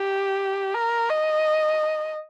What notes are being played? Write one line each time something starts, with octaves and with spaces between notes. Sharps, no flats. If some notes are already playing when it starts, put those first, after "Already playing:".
Already playing: G4
A#4
D#5